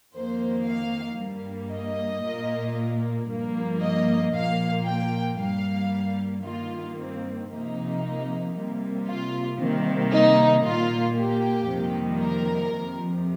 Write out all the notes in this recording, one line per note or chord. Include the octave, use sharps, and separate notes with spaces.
F2 D#3 A#3 C5
F5
G2 G3 A#3
D#5
A#2 A#3
G2 F3 A#3
D#5
A#2 F3 A#3 F5
G5
G2 G3 A#3 F5
G2 D#3 A#3 F4
C4
C3 F3 A#3 D#4
C3 G3 A#3
F4
C3 D#3 G3 A#3 C4
D#4
A#2 A#3 F4
G4
F2 C3 D#3 G3 A#3
A#4
F2 C3 F3